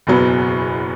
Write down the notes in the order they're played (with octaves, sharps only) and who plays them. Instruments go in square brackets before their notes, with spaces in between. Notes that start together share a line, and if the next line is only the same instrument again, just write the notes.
[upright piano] F#1 E2 B2 F#3 B3